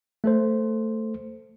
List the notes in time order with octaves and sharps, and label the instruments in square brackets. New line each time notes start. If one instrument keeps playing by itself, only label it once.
[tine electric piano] A3 A4 C5